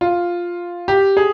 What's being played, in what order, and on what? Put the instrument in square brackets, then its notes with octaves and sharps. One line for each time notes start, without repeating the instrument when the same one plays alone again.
[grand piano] F4
G4
G#4